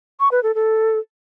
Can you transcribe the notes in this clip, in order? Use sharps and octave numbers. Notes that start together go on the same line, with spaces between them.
C#6
B4
A4
A4